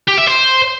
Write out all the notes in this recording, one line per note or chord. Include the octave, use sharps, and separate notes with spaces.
G4
E5
C5